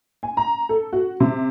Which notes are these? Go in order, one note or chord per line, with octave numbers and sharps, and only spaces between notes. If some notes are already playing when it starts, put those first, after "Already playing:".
G#5
A#5
A4
F#4
C3